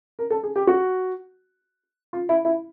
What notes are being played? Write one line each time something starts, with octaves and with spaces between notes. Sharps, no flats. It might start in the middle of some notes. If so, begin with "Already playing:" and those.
A#4
A4
G#4
G4
F#4
F4
E4
E4